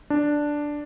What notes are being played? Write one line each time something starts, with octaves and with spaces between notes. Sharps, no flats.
D4